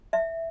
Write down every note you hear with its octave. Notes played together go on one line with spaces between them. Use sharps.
E5